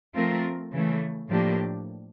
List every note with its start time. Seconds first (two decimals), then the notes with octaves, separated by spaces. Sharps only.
0.15 F3 A3 C4 F4 A#4
0.72 C#3 E3 A3
1.29 A2 F3 A#3 D4 G4